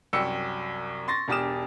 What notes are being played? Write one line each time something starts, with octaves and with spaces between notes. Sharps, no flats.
C2 F#2 G5 E6 C#7
C6 C#6 A6 A#6
E1 D4 G4 D#6 F6 E7